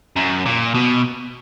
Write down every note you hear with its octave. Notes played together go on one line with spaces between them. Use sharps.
F#2
A#2
B2